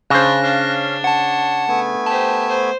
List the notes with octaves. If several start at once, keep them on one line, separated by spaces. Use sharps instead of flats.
C#3 D4 C5 F#6 A#6
C#4 D4 F5
C#5 F#5 A5
A3 B3 G#5
G4 C5 A5
C5